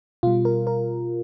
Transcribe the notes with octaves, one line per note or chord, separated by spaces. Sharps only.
B2 G3 F4
A#4
A#4